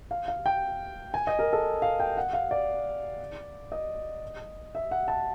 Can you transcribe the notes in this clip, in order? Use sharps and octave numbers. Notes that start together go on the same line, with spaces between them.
F5
F5
G5
G#5
D#5
A#4
A4
F5
G5
F#5
F5
D5
D#5
E5
F#5
A5